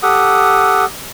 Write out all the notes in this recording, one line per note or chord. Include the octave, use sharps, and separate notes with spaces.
G4 A4 F#5 D#6